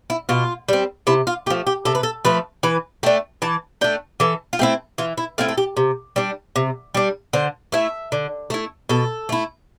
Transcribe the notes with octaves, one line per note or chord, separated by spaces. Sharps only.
E4
B2 F4
G3 C4
C3 E4
F4
F3 A3 G4
G4
C3 A4
B4
A4
F3 A3 B4
E3 B4
A3 D4 G5
E3 A5
A3 D4 G5
E3 A4
F4
A3 C4 E4 G4
E3 F4
E4
A3 C4 E4 F4
A4
G4
C3
G3 D4
C3
G3 D4
D3 C5
A3 E4 E5
D3
A3 E4
B2 A4
A3 E4